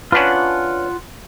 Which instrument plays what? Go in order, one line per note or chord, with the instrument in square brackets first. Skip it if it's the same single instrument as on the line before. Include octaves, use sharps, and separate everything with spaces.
[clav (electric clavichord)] C#4 D4 B4 [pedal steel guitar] F4 F#5